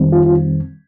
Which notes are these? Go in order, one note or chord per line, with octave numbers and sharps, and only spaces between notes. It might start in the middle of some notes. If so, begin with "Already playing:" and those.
Already playing: F2 D#3 G3 C4
F4
F4